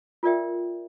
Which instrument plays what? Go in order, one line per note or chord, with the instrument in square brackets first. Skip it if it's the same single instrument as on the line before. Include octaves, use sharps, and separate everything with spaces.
[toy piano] F4 A4 A#4 D5 E5 G5